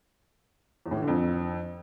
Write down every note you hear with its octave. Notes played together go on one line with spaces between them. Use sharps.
E2
A2
E3
D3
F2